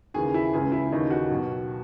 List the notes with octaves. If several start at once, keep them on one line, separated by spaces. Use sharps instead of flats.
D#2 C#3 E3 G#4
E4
C#2 C#3 E3 G#4
E4
D#2 C#3 E3 D#4
F#4
B1 B2